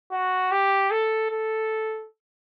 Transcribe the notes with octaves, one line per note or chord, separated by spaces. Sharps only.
F#4
G4
A4
A4